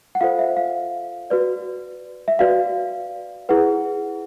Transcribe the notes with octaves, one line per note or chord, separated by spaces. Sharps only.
F#5
F4 A4 C5 F5
E5
F5
F#4 B4 D5
E5
F#4 B4 D5 F5
E4 G#4 B4 F#5